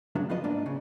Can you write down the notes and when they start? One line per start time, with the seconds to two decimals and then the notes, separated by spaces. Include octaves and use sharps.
0.15 D2 G2 C#3 F#3 B3 D4
0.30 F3 B3 F4 B4 D#5
0.44 G#2 A#3 D4
0.66 C#3